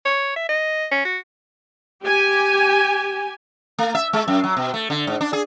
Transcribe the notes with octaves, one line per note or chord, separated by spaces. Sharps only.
C#5
E5
D#5
C#4
F#4
G4 G#5
A3
E5
G#3
F#2
F#3
B2
A3
D3
G#2
D4
G#4